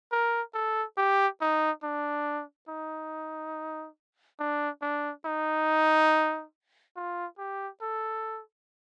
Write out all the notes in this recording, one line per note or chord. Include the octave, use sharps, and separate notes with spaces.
A#4
A4
G4
D#4
D4
D#4
D4
D4
D#4
F4
G4
A4